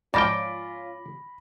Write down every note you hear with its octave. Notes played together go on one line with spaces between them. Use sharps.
G#2 F3 C#4 F4 D5 G5 B5 A#6